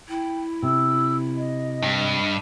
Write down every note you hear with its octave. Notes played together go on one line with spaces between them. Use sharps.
E4 G5
C3 E6
D#5
G2